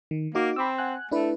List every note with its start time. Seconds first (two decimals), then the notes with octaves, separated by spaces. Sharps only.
0.11 D#3
0.35 A#3 D#4 F#4 D6
0.56 C4 B5 D6 E6
0.78 F#5 G#5 F#6
1.12 A3 D4 E4 B4